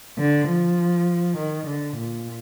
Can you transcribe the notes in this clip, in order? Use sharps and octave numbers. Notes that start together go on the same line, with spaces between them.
D3
F3
D#3
D3
A#2